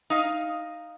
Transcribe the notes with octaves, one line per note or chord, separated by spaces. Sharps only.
D#4 F5